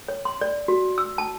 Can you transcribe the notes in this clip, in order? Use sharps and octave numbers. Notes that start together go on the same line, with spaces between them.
C#5
C6
D5
F#4
E6
A5